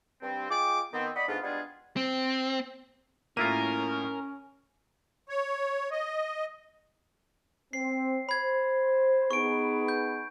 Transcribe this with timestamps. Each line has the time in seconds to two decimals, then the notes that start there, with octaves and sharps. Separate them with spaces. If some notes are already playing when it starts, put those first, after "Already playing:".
0.22 G2 C4
0.50 G#3 F4 G#4 G5 D6
0.93 D#3 B3 C4
1.16 D5 D#5 F#5 B5
1.28 G#2 A3 B3 D4 F4
1.43 G3 G#3 B3 D4 F4 G#4
1.96 C4
3.37 A2 A#3 C#4 E4 F4 A#4 D#7
5.29 C#5
5.91 D#5
7.73 C4 C7
8.29 C5 B5 G#6
9.31 B3 D#4 G#4 C#6 D7
9.88 G6